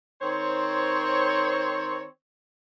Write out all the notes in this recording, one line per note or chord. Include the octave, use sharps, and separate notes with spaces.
D#3 C4 C5 C#5